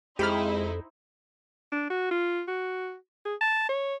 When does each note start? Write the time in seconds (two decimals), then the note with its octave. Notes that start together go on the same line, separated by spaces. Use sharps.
0.19 F2 G#3 D#4 E4 G4 C5 B5 F6
1.72 D4
1.90 F#4
2.11 F4
2.48 F#4
3.25 G#4
3.41 A5
3.69 C#5